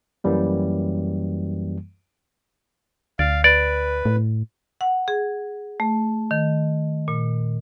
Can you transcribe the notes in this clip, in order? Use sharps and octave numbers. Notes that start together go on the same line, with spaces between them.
F#2 E3 G3 A#3
D2 D5 F5
B4 D5
A2
F#5
G#4
A3
D#3
A#2